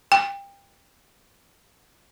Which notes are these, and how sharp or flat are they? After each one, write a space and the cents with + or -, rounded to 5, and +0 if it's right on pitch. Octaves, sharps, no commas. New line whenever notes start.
G5 +25